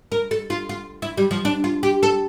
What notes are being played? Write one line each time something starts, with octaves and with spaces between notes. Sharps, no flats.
A#4
A4
F4
F4
E4
G3
F3
D4
F4
G4
A4